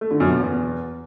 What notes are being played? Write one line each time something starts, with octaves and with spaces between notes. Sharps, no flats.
A3
D3
F#2
B2
E2